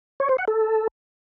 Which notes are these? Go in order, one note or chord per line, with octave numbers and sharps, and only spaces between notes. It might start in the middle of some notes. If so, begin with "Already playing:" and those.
C#5
C5
F#5
A4